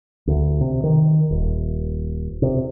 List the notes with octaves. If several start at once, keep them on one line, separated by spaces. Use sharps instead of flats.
D2
C3
D#3
D#1
C3